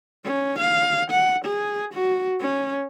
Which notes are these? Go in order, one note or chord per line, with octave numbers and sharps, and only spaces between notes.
C#4
F5
F#5
G#4
F#4
C#4